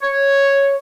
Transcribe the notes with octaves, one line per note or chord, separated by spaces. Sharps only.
C#5